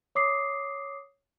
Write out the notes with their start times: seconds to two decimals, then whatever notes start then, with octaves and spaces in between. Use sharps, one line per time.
0.15 C#5 D6 D#6 C7